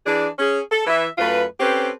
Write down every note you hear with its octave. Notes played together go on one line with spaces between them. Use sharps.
E3 D4 G#4
C#4 G#4
A4
E3 E5
F#2 A3 F4 B4
C4 C#4 G4 A4 B4 C5